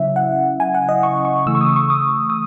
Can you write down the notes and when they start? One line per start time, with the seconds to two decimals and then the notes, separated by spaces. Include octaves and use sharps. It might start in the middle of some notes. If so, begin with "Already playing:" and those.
Already playing: C#3 F#3 C#4 E4 E5
0.16 F#5
0.60 G#5
0.75 F#5
0.89 D#5
1.03 C#6
1.25 C#6
1.46 C#3 E3 A3 E6
1.55 C#6
1.61 D#6
1.76 C#6
1.90 D#6
2.30 D#6